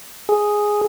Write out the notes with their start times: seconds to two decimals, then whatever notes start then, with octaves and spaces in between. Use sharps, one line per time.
0.29 G#4